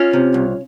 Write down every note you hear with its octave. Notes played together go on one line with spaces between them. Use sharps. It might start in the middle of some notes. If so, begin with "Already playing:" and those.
Already playing: C#4 F4
C3
C2